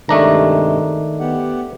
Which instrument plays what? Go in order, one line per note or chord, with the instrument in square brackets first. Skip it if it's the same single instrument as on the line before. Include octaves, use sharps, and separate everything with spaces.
[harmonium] G2 C3 G#3 [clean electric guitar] D#3 [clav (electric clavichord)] A3 D4 A#5
[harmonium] B3 G4 F#5